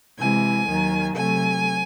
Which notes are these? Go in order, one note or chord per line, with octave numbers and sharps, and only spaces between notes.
C3 E3 G#3 G#5
D#2 D#3 F#3
C3 F#3 A3 G#5